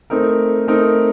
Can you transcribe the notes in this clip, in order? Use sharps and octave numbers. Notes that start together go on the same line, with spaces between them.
A3 C4 D#4 A#4
A3 C4 D#4 A#4